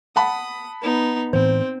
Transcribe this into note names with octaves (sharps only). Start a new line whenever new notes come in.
F#5 A5 B5 D#6
B3 D#4
A2 E3 C4 C5